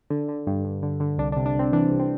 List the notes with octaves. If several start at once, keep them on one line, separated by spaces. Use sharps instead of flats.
D3
D3
G2
G2
D3
D3
C2 D4
C3 D4
D4
C2 C4
E3 D4
C2
C4